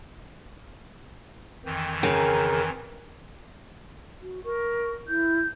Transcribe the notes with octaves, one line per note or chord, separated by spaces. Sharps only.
F2 D#3 E3 G5
C#3 A#4 G5 G#5 A#5
F#4
A#4 C#6
E4 G6